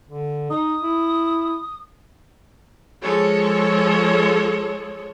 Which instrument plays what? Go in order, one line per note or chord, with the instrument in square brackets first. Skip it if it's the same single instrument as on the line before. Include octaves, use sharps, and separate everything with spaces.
[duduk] D3
[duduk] D#4 [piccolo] D#6
[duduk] E4
[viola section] F3 G#3 A4 C#5